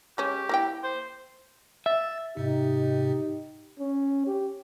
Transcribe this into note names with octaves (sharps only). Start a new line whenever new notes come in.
G#3 C#4 G4
A#3 E4 G5
C5
E5 A6
G#2 C3 D#4 G4
C#4
G4